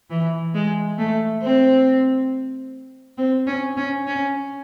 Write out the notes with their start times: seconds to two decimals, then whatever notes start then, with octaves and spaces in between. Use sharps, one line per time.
0.10 E3
0.54 G#3
0.98 A3
1.42 C4
3.18 C4
3.47 C#4
3.77 C#4
4.07 C#4